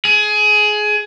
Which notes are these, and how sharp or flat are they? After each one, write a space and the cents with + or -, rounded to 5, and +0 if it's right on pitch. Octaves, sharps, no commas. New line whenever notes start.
G#4 +20